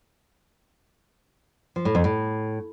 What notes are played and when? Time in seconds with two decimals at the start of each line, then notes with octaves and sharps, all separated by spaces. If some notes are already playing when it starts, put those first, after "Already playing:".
1.76 F3
1.85 A2
1.95 F2
2.04 A2